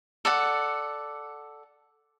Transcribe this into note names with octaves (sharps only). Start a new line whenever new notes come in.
A4 D5 F#5